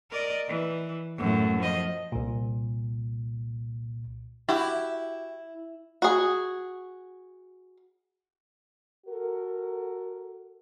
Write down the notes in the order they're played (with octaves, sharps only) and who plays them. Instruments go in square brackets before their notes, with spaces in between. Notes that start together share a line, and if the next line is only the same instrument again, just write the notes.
[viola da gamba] A#4 D5 D#5
E3
F#2 A2
F3 D#5
[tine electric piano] C2 A#2
[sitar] E4 [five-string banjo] F#4 G4
[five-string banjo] F#4 G#4
[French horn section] F#4 A4 A#4